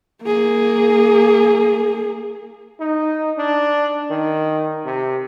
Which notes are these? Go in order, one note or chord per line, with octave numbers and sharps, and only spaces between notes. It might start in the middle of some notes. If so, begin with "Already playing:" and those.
A#3 G#4
D#4
D4
D#3
C3